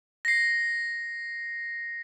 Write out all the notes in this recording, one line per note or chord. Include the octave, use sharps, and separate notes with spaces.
A#6 C7